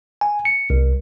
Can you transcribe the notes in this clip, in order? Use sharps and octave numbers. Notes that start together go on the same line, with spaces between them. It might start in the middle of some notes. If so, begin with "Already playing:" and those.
G#5
C#7
C2